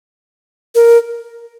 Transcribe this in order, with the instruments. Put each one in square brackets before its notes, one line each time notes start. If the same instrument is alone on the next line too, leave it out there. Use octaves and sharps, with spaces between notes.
[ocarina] A#4